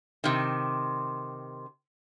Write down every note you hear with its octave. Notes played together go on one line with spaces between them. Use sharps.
C3 D#3